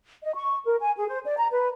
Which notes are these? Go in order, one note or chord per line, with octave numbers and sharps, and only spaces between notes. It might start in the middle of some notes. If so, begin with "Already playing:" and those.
D#5
C#6
A#4
G#5
G#4
C5
D5
A#5
B4